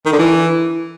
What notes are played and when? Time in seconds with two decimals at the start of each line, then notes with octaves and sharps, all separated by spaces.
0.05 D#3
0.12 D3
0.19 E3